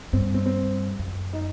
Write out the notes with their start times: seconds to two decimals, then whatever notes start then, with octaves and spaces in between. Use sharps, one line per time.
0.13 G2 C4
0.34 C4
0.46 C4
0.99 F#2
1.33 D#4